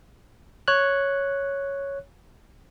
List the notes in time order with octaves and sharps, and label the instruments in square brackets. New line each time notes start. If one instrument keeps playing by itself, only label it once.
[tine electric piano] C#5 F#6